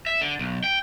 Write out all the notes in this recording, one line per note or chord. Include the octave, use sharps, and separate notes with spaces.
E5
D3
B1
G5